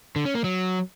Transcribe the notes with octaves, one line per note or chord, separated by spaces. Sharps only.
D3
C#4
A#3
F#3